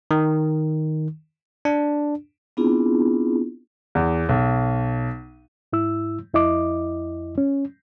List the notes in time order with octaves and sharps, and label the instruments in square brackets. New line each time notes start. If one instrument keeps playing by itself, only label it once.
[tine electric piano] D#3
D4
[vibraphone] B3 C4 D4 E4 F4 G#4
[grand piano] E2
B1
[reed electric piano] G#2 E4 E6
F2 E4 D#5 D6
C#4